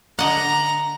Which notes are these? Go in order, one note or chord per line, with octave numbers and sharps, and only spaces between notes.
D3 D#5 F#5 A#5